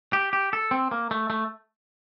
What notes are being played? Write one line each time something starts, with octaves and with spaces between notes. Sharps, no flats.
G4
G4
A4
C4
A#3
A3
A3